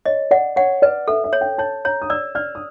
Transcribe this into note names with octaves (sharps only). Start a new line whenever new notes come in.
C#5 D#5
D5 F#5
C#5 F#5
B4 D5
A4 E5
E5
C#5
G5
C#5 A5
C#5 A#5
D#6
D5 E6
D5 F6
D#6